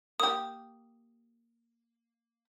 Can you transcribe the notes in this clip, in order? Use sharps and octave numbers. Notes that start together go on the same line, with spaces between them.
A#3 G4 D#6